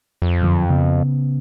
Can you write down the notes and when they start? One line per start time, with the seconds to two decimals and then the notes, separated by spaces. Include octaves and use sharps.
0.22 F2
0.42 F#2 D3 F3
0.70 C#3 B3